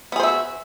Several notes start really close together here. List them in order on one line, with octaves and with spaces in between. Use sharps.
B3 G#4 C5 E5 F#4